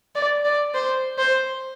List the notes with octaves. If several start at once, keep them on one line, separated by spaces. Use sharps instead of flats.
D5
D5
C5
C5